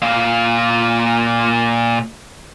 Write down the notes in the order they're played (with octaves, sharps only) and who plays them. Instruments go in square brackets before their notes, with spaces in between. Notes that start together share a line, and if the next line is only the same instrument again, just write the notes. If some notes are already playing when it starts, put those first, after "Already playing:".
[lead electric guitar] A#2 F5